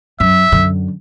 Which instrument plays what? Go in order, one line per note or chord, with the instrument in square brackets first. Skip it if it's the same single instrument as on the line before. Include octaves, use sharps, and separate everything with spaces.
[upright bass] F#2 [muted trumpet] E5
[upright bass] F#2 D3